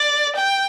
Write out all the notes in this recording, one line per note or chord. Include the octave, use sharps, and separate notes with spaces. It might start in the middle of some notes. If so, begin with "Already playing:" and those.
Already playing: D5
G5